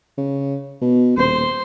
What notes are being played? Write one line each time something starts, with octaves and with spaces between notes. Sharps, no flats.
C#3
B2
D#1 C5